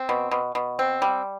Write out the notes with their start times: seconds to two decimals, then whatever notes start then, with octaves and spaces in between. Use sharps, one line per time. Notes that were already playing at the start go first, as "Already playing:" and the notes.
Already playing: C4
0.09 B2
0.31 B2
0.55 B2
0.79 C4
1.02 G3